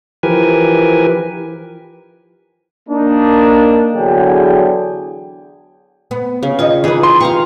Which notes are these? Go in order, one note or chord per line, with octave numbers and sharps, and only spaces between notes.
E3 F3 G4 A#4 B4 G#5
A#3 D4 D#4
E2 D3 F#3 F#4 G#4 G5
B3
C#3
D#3 F4 C#5 D#5
E3 D#4 G#4 B4
C6
G4 F5 A#5 C#6